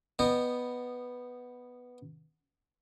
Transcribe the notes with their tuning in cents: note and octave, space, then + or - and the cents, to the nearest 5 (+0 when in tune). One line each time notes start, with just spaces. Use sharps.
B3 +0 D#5 -25 G5 +0